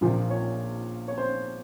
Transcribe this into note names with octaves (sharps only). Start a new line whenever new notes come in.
A#1 A#2 F3
C#5
C#5
C5